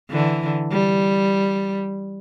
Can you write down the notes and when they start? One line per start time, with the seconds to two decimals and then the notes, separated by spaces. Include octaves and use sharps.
0.10 D3 E3
0.72 G3